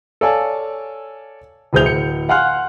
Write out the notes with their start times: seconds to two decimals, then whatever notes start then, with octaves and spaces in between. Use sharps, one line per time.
0.21 A4 C#5 D5 F5 G#5 A5
1.73 D1 D2 G#4 C5 G6 F7
1.85 D1 C#7
2.29 F5 F#5 G#5 C6 F6 F#6